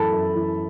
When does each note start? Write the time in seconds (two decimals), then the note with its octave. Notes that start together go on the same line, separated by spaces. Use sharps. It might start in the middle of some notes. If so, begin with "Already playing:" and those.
Already playing: F#2 E3 A4 A5 B5
0.12 F#2
0.35 E3